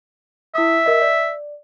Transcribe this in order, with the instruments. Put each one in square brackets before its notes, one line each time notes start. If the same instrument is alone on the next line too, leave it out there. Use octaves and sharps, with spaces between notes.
[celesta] E4 D#6 [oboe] E5
[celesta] A#4 D#5
D5